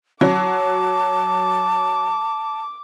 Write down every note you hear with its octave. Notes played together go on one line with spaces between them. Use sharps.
F#3 A5 D6